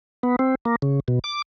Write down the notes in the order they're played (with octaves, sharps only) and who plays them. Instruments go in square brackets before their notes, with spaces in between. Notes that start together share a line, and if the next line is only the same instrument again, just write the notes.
[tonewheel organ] B3
C4
A#3
C#3
B2
D6